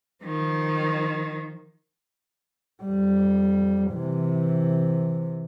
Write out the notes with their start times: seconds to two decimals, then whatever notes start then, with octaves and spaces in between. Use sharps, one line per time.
0.24 D#3 F3
2.83 F2 G3
3.93 C3 E3